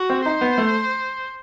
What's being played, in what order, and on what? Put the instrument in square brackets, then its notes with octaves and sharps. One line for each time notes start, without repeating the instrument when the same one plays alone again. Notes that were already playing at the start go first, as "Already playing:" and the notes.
Already playing: [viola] F#4
[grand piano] C4
[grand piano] D#4 [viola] C5
[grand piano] B3
A3